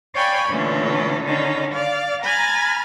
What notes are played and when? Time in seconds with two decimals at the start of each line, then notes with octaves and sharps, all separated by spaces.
0.15 C#5 D5 F5 G5 G#5 B5
0.49 A#2 D3 E3 A3 C#4
1.23 D3 D#3 C#4 D#4
1.72 D5 F5
2.23 G#5 A#5 B5 F6 G#6 A6